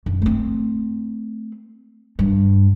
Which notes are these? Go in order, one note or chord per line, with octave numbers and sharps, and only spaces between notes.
F#2
A3 C4
G2